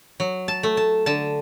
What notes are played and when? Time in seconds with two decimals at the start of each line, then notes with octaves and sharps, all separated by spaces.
0.20 F#3
0.48 A5
0.63 A3
0.77 A5
1.06 D3 A5